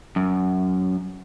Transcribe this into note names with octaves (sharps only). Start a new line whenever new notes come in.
F#2